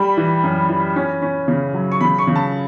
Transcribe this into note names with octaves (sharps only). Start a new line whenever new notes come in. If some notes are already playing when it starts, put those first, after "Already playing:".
Already playing: G3 B5
E3
F#2
E3
C#4
C#4
C#3
F#3
C#6
C#3 B5
C#6
C#3
A5